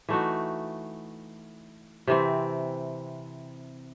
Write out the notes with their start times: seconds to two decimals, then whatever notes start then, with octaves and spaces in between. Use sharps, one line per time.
0.09 E3 A3 D#4 F#4
2.07 C3 E3 C4